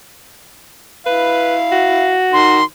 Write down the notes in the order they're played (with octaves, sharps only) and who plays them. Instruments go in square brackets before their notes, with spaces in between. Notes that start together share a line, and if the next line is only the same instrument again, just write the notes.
[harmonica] E4 F5 [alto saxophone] B4
[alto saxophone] F#4
[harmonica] D#3 [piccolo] C6